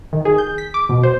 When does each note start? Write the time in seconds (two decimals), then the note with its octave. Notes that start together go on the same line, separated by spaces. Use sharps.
0.13 D#3
0.25 G#4
0.38 G6
0.58 B6
0.74 D6
0.89 B2
1.03 C5